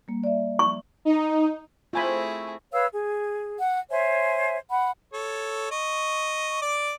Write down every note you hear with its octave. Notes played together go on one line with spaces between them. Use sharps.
G3 A#3
D5 E5
C#6
D#4
A3 C4 E4 F4 G#4 G#5 B5
B4 C#5 F5 E6
G#4
F#5
C5 C#5 E5 G#5
F#5 B5
A4 C#5
D#5 C#6
D5 D6